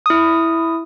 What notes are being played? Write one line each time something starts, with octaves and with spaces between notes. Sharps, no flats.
E4 D#6